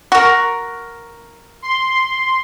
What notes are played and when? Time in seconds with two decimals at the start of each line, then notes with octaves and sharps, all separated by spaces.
0.12 F#4 A#4 C#6
1.62 C6